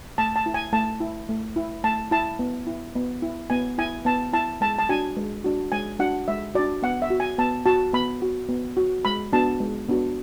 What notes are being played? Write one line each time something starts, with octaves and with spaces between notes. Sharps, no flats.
A3 A5
A5
E4
G#5
A3 A5
E4
A3
E4
A3 A5
E4 A5
B3
E4
B3
E4
B3 G#5
E4 G#5
B3 A5
E4 A5
G#3 A5
A5
D4 F#4 G#5
G#3
D4 F#4
G#3 G#5
D4 F#4 F#5
G#3 E5
D4 F#4 D5
B3 F#5
E5
F#4
G#5
B3 A5
F#4 A5
B3 B5
F#4
B3
F#4
G#3 B5
B3 D4 F#4 A5
G#3
B3 D4 F#4